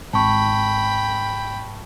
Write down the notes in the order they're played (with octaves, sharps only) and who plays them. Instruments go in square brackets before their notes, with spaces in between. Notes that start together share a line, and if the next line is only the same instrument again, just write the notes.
[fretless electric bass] G#1 [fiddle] G5 B5 [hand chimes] A5 C#6